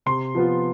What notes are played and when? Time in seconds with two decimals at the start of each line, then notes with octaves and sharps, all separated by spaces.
0.06 C3 C6
0.35 F3 B3 F4